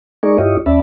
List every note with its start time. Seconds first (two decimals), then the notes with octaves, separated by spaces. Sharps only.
0.23 G#3 D#4 G#4 A#4 D5 C#6
0.38 G2 E4 F4 G4 C#5 D#5
0.66 D#2 C#4 D5 E5 A5 B5